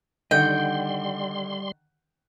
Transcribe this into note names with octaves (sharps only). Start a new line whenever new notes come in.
D3 D#3 G3 D#5 F#5 G5 C6